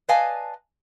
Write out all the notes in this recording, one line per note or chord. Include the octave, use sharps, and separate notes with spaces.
B4 D5 D#5 F5 G#5 A5